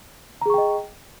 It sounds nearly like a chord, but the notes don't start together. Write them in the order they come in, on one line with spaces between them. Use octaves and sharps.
A#5 G#4 C#6 G5 D#5